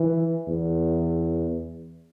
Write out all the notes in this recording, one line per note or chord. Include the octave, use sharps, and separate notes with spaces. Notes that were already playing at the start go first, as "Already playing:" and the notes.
Already playing: E3
E2